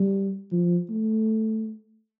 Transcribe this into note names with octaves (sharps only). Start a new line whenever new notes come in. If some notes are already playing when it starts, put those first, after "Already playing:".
Already playing: G3
F3
A3